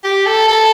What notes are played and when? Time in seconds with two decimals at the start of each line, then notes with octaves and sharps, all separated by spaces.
0.04 G4
0.26 A4
0.48 A4